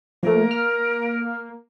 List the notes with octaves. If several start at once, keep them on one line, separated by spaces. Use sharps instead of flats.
F3 A3 A#3 A#4
F6